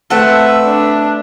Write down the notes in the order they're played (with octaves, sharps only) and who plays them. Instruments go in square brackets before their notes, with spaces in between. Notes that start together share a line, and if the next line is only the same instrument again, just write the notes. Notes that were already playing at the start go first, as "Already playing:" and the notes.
[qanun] A3 C4 [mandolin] A4 F#5 [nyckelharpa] B4 E5
[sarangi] D4